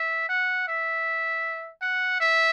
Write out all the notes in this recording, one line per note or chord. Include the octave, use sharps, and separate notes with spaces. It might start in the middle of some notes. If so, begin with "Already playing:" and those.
Already playing: E5
F#5
E5
F#5
E5